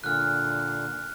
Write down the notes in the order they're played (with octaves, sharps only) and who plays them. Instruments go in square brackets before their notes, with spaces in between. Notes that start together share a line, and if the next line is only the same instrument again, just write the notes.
[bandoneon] A#2 D3 [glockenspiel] F6 F#6